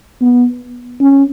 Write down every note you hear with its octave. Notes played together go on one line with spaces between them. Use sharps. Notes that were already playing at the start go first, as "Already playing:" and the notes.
B3
C#4